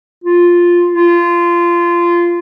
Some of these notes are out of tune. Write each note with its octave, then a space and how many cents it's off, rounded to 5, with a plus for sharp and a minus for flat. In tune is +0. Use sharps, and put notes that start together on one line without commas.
F4 +0
F4 -20